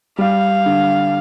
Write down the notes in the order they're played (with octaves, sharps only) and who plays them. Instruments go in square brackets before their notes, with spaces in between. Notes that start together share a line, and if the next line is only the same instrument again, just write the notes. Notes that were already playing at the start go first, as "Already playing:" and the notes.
[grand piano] G3 [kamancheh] F5
[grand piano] D3